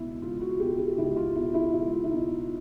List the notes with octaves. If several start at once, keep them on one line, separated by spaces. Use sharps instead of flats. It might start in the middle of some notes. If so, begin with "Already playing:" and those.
Already playing: C#2 B2 E4
C#2 F4
F#4
B2 G4
G4
C#2 E4
F4
B2 E4
E4
C#2 E4
F4
E4
B2 D#4